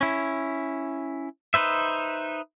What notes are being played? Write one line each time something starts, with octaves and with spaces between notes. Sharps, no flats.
C#4 E4
D#4 B4 C5 E5